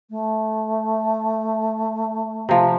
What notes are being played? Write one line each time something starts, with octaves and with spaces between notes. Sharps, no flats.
A3
C3 F3